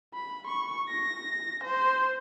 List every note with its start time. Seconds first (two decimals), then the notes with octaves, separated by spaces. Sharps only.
0.14 B5
0.47 C#6
0.88 A#6
1.64 C5